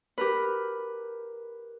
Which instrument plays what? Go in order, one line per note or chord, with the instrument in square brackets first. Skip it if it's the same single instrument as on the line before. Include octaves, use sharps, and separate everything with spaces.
[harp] G4 A#4 B4